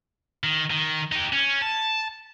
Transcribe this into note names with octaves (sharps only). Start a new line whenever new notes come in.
D#3
D#3
D#4 G4
C#4
A5